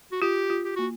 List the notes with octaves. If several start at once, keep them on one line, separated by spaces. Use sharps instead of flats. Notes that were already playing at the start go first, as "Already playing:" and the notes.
F#4
F4 G4
F4
G4
A#3 F#4